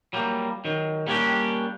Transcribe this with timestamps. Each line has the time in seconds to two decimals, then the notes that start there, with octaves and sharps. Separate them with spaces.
0.13 F#3 G3 A#3
0.65 D#3 F#3
1.07 G3 A#3 B3 C#4 D4 G4